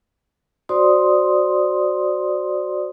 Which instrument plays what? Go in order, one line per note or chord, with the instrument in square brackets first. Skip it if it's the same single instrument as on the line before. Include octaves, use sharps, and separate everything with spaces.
[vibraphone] F#4 C5 D5 C6 D#6